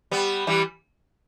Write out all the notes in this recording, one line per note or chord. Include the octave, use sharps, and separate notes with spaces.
G3 B3
E3 G3